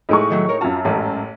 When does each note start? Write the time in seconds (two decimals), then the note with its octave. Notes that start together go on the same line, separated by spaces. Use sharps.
0.09 A2 G#3 D#4 C#6
0.30 D#3 F#3 A3
0.49 A#4 C#5
0.61 F#2 F4 F#4 A5
0.85 A1 G#2